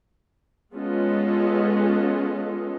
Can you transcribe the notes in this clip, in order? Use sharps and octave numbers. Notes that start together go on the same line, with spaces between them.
G#3 B3 C#4 F4 A4 D#5